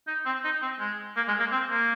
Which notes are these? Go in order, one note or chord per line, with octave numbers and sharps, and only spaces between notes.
D#4
C4
D#4
C4
G#3
A#3
G#3
A#3
C4
A#3